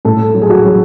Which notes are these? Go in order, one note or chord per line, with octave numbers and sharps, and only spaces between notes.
A2 A4
F#3
G#4
F#4
F#3